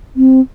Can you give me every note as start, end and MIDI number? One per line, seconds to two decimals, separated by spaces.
0.16 0.41 60